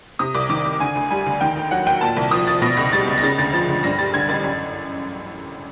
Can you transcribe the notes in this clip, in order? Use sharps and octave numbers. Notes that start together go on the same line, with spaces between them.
C3 D#6
C2 D6
D#3 D6
C2
D3 G#5
D2
G3 G#5
D2
D#3 G5
D#2
F#3 F#5
D#2 G5
A#2 A5
C2
F3 D#6
C2 A6
B2 A#6
C#2 A#6
G3 A6
C#2
A#6
C#3 A6
D2 A6
F3 A6
D2
G2 A#6
G3 A6
D3 G#6
A1 A6
F#2